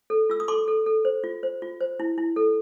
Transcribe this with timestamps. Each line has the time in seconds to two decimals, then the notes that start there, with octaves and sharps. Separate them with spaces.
0.10 A4
0.30 F4 E6
0.40 D#6
0.48 A4 C6 D6
0.68 A4
0.86 A4
1.05 C5
1.24 F4
1.43 C5
1.62 F4
1.80 C5
2.00 E4
2.18 E4
2.36 A4